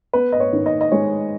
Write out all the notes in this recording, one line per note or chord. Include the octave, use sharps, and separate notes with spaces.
B3 B4
D#5
C#5
D#3
D#5
D#5
G#3 C#5